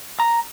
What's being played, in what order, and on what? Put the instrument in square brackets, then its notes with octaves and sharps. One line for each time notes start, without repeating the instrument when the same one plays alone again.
[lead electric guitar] A#5